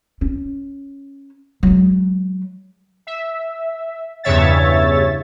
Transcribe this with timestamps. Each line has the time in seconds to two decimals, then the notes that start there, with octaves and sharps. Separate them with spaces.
0.21 C#4
1.63 F#3 G#3
3.07 E5
4.24 E2 G2 C#3 C#5 E5 A6